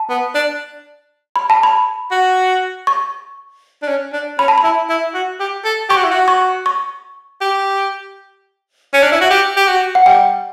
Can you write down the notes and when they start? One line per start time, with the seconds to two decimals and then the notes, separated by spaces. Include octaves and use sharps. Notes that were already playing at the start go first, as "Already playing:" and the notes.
Already playing: A5
0.10 B3
0.35 D4
1.36 B5
1.50 A5
1.63 B5
2.11 F#4
2.87 C#6
3.83 D4
3.88 C#4
4.13 D4
4.38 C#4 B5
4.48 A5
4.58 B5
4.64 E4
4.89 E4
5.14 F#4
5.40 G4
5.65 A4
5.90 G4 C#6
5.97 F#4
6.04 E4
6.11 F#4
6.28 C#6
6.66 C#6
7.41 G4
8.94 C#4
9.03 D4
9.12 E4
9.21 F#4
9.30 G4
9.57 G4
9.68 F#4
9.95 F#5
10.06 G3 G5